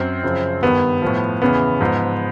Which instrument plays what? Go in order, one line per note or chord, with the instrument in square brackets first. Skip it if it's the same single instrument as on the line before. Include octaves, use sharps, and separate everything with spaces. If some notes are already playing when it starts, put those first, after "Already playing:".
Already playing: [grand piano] F#2 C4
F#2 C#3 F3
G2 D#3 B3
A2 F3
E2 C#3 E3 B3
G#2 F3